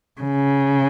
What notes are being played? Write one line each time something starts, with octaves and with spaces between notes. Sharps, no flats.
C#3